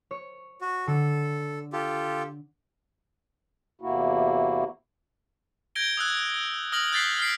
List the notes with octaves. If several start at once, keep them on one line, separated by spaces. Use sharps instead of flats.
C#5
F#4
D3 A4
F4 G4 A4
E2 C3 A#3 E4 F#4
G6 G#6 A#6 D7 G7
D#6 E6 F#6 G#6
D#6 F6 A#6 F#7
F#6 G6 A6 B6 C7
F6 B6 C7 D7